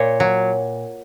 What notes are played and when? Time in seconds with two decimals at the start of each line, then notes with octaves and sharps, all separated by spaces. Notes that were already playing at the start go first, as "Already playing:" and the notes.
Already playing: A#2 C#5
0.20 F#3